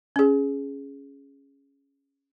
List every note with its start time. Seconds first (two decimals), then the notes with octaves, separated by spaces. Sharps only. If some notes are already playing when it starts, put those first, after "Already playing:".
0.16 C#4 G#4